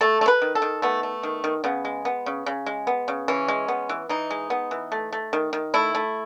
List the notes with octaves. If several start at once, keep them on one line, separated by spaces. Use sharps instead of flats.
A3 A4
A3
B4
D#3
A4
D#3
A3 B3
A3
D#3
D#3
C#3 B3
G#3
B3
C#3
C#3
G#3
B3
C#3
E3 C#4
G#3
B3
E3
E3 D#4
G#3
B3
E3
A3
A3
D#3
D#3
A3 E4
A3